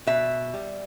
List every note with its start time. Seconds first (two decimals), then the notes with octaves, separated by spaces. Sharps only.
0.07 B2 E5
0.54 G3